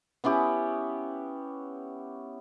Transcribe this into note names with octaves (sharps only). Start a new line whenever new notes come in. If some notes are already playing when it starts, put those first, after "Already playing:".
B3 C#4 E4 G4